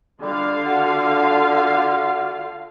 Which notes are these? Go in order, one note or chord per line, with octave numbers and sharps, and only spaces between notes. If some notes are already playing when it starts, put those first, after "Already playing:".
D3 G3 F4 F5
F#4